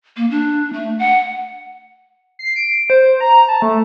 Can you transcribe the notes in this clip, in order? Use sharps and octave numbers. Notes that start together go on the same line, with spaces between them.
A#3
D4
A3
F#5
C7
D7
C5
A#5
A5
A3